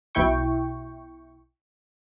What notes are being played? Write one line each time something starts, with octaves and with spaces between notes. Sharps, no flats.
B1 B2 E4 G5 C#6